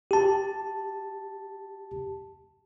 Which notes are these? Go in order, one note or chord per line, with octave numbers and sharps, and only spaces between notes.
G4 A5